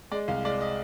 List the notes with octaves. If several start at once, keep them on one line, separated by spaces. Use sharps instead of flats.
G#3 D5
C2 F5
G#3 D5
D#5